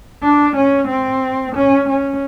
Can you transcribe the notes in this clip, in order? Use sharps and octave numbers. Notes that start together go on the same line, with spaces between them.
D4
C#4
C4
C#4
C#4